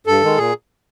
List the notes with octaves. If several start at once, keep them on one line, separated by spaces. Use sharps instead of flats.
G2 A4
D#3 G#3
A#2 G#4